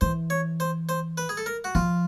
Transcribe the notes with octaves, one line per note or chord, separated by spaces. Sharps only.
E3 C5
C#5
C5
C5
B4
G#4
A4
A#4
F#4
F3 F4